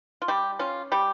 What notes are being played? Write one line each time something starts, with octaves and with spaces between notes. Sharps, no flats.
F4
G3 G4
C#4 F4
G3 G4